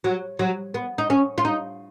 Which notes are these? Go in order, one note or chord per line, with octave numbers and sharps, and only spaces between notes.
F#3
F#3
B3
D#4
C#4
F4
D#4